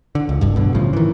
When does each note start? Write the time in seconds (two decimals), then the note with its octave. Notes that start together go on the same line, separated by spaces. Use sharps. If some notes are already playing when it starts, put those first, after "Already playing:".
0.15 D3
0.29 C#2
0.41 D1 G1 C2 G2
0.56 A1 G2 B2 D3
0.74 A2 C#3 F3
0.93 D#3 E3